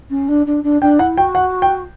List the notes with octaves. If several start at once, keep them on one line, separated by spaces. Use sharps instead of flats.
C#4
D4
D4
D4
D4 G5
E4 F#5
F#4 G5
F#5
G5